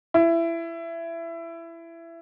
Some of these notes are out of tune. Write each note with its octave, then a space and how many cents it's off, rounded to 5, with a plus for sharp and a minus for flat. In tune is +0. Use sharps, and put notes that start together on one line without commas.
E4 +20